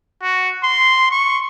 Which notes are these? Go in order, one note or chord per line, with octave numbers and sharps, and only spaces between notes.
F#4
C6
C#6